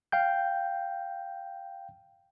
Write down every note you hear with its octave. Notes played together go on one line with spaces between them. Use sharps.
F5 G5 G6